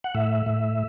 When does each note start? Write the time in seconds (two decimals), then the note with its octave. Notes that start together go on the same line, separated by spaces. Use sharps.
0.04 F#5
0.15 A2 E5
0.46 A2